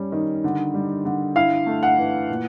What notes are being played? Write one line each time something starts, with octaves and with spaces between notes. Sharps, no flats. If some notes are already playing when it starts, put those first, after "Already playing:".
Already playing: G3 C#4
D#3
D3
G3
D3
E4 F5
A3
F#5
E3
A#2